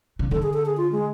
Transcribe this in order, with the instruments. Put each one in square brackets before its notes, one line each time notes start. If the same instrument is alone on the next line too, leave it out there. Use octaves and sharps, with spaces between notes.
[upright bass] C#3
[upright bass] D3 [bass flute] A4
[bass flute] G#4
A4
G#4
F4
G#3